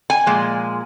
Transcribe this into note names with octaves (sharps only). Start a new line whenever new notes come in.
G#5
A#2 F3 G#3